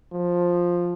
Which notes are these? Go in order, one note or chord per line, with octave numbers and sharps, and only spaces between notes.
F3